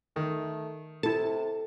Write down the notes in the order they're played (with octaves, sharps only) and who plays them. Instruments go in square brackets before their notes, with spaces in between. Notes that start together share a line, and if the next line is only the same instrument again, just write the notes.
[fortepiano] D#3 [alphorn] A3
[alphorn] C3 [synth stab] E4 A5 [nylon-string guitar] A4